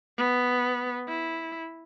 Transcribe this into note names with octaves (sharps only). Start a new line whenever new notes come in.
B3
E4